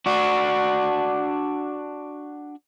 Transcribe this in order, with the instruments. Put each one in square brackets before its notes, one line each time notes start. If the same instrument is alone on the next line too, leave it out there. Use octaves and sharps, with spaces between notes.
[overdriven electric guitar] D4 F#4